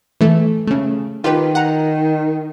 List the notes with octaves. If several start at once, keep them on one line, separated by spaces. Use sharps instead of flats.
E3 A3
C#3 A3
D#3 F4 G4 B4
F#5 A#5